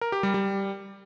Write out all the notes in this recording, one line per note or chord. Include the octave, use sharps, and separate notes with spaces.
A#4
G4
G3
G3